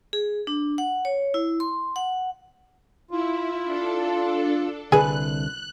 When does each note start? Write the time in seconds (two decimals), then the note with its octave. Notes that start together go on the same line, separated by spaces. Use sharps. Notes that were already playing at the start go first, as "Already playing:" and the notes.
0.13 G#4
0.47 D4
0.78 F#5
1.05 C#5
1.34 E4
1.60 C6
1.96 F#5
3.11 E4 F4
3.65 D4 A4
4.92 C2 D3 G#4 B4 F#6